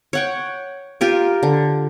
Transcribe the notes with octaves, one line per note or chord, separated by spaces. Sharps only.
C#5 F#5 G5
F4 G4 A#4
D3